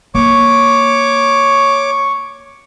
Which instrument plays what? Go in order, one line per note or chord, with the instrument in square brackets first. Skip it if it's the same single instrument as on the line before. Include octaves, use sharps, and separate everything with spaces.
[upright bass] A#3 [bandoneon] C#5 D6 [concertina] C#6